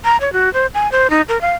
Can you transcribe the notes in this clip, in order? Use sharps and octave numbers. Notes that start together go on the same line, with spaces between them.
A#5
C#5
F#4
C5
G#5
C5
D#4
A#4
F5